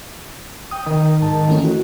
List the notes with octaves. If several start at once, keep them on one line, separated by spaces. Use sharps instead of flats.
G5 D#6
D#3
G#2 A5
E3 A3 C#4
F#4